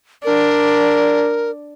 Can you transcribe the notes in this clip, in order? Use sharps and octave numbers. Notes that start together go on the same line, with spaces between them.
D4 A#4